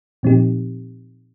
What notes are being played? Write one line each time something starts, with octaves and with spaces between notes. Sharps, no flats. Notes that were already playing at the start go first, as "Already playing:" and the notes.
A#2 F3 C4 D#4 G4